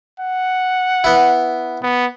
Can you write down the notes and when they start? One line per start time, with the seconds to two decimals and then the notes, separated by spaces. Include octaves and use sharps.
0.20 F#5
1.04 B3 E4
1.82 B3